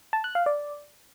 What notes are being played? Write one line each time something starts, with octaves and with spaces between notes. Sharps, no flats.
A5
F#6
F5
D5